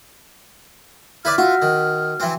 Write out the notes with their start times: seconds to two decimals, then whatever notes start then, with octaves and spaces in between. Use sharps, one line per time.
1.25 E4 B4 D5 F6
1.38 F4 F#4 E5
1.62 D#3
2.20 E3 C4